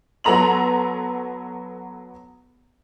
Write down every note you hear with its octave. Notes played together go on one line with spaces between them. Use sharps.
F#3 B3 A4 A#5 C6 F#7